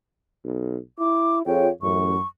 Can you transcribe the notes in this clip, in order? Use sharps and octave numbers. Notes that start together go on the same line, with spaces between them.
B1
E4 D6
F2 F4 G#4 C#5 G5
A1 F#2 C#6